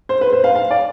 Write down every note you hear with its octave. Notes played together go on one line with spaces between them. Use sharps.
C5
B4
C5
F5
F5
D5